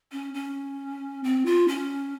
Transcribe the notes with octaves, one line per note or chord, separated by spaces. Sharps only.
C#4
C#4
C4
F4
C#4